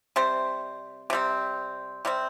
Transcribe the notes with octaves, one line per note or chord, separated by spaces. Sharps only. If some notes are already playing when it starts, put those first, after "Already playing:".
C3 G3 C4 C5
C3 G3 C4
C3 G3 C4